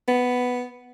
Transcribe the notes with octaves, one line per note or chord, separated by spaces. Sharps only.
B3